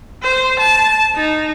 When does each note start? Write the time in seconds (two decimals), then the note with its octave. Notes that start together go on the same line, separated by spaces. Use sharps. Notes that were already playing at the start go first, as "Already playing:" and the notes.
0.23 C5
0.60 A5
1.16 D#4